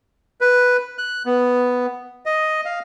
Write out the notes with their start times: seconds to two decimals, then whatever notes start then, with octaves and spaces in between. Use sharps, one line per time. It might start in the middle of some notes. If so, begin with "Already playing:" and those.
0.41 B4
0.98 F#6
1.25 B3
2.26 D#5
2.65 F5